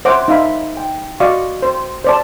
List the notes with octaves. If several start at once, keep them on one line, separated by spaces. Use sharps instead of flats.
C5 C#5 E5 F#5 D6
D#4 E5 F5 B5
G5
F#4 D5 D#5 F5 C#6
C5
C5 D5 A5